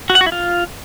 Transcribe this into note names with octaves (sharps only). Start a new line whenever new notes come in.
F#4
F#5
F#4
E4
F4